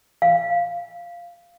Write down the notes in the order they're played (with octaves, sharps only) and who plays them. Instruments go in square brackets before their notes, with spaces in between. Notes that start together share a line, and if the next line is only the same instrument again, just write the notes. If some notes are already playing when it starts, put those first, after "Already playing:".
[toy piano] F5